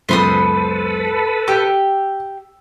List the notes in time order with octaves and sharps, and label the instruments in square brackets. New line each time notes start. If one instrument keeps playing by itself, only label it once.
[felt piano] C#2 F#2 B3 [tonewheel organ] A4 B4 [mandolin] C5 B5 D#6
[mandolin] G4 [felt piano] E6